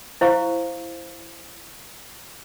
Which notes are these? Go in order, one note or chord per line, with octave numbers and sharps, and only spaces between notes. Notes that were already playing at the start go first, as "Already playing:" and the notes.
E4 C5 F5 C#6